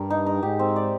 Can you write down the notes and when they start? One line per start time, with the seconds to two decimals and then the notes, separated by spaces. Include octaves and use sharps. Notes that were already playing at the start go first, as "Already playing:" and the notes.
Already playing: G2 A#4
0.10 D#4
0.26 D#4
0.43 G#2 G4
0.59 C4
0.76 D5